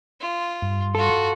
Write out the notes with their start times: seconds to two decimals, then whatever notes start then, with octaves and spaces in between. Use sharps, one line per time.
0.21 F4
0.62 G2
0.95 F4 F#4 A4